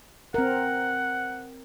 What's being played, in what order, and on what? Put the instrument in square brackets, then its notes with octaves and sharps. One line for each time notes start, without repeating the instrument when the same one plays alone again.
[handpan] C4 A#4 [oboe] F#5